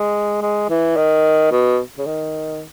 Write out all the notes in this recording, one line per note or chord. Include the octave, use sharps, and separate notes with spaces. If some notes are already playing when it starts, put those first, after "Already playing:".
Already playing: G#3
G#3
E3
D#3
B2
C#3
D#3